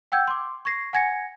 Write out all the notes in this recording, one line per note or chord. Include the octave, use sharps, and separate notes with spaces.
F#5 G5 E6 G6 G#6
C6 D6
C#6 G#6 A#6 C7
F#5 G#5 G#6 A#6 C#7